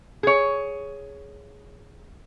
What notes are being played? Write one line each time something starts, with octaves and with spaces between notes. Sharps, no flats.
G#4 C#5